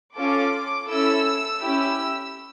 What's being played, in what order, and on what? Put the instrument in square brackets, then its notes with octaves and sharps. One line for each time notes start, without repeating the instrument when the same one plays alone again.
[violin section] C#4 F4 A4 D6
C#4 E4 A4 E6
C#4 E4 G4 E6